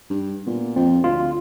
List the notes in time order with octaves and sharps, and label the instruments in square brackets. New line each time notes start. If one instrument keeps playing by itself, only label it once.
[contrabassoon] G2
[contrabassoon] A#2 [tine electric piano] B3
[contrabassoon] F2 [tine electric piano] C4
[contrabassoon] D2 [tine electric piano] F4